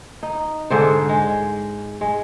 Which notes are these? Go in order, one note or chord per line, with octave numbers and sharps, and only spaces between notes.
D#4
G#2 D3 C5
G#3
G#3